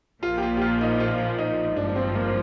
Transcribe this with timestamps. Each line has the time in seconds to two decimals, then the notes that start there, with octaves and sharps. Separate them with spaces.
0.23 A#1 A#2 F3 A#3 F4
0.38 G4
0.42 F4
0.57 G4
0.61 F4
0.81 D#4
1.00 F4
1.39 D#4
1.76 G#1 G2 F3 D4
1.89 D4
1.95 C4
2.15 A#3